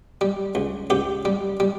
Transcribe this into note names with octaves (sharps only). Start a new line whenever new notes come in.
G3
C#2
C#2 G4
G3
G3